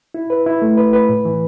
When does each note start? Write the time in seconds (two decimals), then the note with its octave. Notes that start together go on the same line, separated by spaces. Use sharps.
0.14 E4
0.30 B4
0.46 E4
0.62 A3
0.78 B4
0.93 B4
1.09 A2
1.25 E3